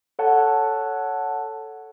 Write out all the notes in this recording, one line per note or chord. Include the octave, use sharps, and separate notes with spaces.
A4 C#5 F#5 A5